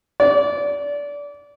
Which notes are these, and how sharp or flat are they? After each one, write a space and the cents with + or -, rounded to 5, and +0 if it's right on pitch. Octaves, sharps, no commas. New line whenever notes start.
D5 -25